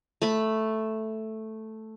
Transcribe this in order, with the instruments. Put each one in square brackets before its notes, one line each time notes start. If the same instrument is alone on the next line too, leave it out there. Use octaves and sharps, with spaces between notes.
[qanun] A3 B5